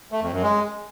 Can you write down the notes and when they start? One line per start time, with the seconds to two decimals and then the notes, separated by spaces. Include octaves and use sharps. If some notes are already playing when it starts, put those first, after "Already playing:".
0.12 A3
0.22 F2
0.32 F#2
0.43 G#3